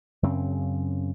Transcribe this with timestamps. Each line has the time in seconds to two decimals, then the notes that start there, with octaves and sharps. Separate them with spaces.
0.23 F#2 C#3 C4